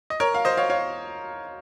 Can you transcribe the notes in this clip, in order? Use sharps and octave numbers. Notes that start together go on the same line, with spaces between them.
D#5
A#4 C#5
F5
C5 D#5
C#5 F5
C#5 F5